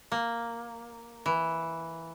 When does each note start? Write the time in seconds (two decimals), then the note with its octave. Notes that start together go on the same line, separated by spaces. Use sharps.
0.12 A#3
1.26 E3